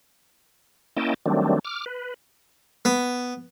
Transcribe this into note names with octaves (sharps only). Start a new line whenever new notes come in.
A#3 C#4 E4 D#5 G5 A5
D#3 F#3 G3 A3 C4 D4
D6 F6
B4
B3